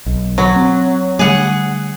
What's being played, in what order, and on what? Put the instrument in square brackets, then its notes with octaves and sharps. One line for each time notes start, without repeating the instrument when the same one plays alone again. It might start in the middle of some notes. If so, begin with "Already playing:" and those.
[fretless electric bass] B1
[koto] F#3
[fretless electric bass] C4
[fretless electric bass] D3 G3 A3 [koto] G#4 F#5